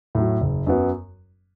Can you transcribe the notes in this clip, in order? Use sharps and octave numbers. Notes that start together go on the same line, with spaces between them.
A2 F#3
F#1
F#2 F#3 B3